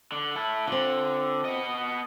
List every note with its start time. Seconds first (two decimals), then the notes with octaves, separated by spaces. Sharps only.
0.12 D3
0.35 E4 A4
0.67 D3 C4 F4
1.45 B3 D#5